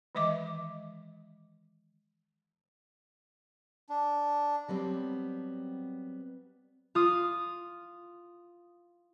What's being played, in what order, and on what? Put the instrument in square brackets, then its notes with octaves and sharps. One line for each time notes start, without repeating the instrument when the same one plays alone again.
[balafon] D#3 E3 G#3 D#5 E5 D6
[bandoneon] D4
[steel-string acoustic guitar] F#3 G3 B3 C4
[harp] F4 D#6